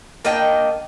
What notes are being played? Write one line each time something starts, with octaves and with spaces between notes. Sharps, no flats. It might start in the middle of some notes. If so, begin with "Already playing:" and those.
A#3 D4 D#5 G5